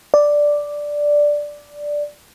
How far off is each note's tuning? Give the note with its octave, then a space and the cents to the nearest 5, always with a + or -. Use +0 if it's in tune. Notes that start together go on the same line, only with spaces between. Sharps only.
D5 +0